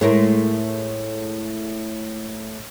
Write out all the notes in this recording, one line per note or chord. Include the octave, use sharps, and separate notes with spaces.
A2 G#3 A3 A#4